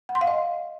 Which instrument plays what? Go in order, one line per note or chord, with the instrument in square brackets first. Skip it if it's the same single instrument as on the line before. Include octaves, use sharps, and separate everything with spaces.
[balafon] F#5
C6
F5
D#5